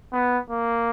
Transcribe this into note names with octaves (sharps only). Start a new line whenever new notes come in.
B3
A#3